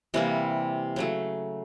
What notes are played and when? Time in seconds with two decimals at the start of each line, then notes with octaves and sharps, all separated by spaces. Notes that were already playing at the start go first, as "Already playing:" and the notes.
0.14 C3 E3 G3 A#3
0.96 C#3 F#3 A3